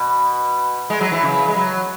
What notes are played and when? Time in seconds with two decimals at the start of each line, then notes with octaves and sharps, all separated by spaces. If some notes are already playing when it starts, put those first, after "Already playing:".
Already playing: B2
0.90 G#3
1.01 F#3
1.12 E3
1.22 C#3
1.48 G#3
1.56 F#3